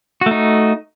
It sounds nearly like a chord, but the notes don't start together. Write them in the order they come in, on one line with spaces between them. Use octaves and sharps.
F#4 A3 D#4